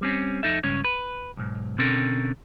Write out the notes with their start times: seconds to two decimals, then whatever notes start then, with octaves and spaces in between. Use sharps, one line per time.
0.01 G3 C4 C#4
0.43 F2 D#4 A4 E5
0.63 C#2 G2 C#4 C#5
0.84 B4
1.37 B1 G#2
1.78 B2 D3 C4 C#4 A4 A#4